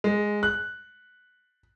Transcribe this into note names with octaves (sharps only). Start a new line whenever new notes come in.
G#3
F#6